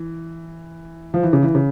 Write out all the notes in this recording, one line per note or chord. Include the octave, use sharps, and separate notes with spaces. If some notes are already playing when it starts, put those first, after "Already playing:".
Already playing: E3
F3
E3
C#3
E3
C#3